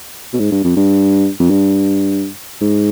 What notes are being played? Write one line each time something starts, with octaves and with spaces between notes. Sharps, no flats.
B2
G#2
G2
F2
G2
F2
G2
G#2